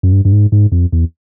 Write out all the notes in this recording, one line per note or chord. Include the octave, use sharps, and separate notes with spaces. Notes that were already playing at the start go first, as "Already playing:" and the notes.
F#2
G2
G2
G#2
G#2
F2
E2